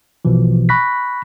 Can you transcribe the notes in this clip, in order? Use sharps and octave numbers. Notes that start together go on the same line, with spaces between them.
A#1 B2 E3 F3
B5 C#6 F#6 A#6 B6